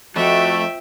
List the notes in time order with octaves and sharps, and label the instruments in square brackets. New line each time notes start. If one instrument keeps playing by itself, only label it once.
[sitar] F2 [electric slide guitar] A3 [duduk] F#4 [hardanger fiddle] E5 G5